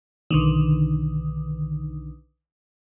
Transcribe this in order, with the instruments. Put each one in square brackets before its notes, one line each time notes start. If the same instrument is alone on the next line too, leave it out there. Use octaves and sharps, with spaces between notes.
[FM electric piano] B1 D3 D#3